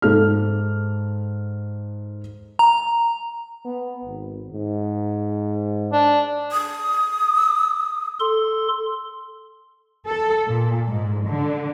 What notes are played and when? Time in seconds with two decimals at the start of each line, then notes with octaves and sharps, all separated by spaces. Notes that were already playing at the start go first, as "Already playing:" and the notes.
0.02 G#2 A4 F6
2.59 A#5
3.65 B3
4.04 G#1
4.52 G#2
5.92 D4
6.52 D#6
8.20 A4 C6
10.08 A4
10.48 A#2
10.88 G#2
11.28 D3